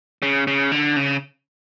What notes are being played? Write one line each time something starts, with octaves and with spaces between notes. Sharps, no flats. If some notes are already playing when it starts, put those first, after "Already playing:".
C#3
C#3
D3
C#3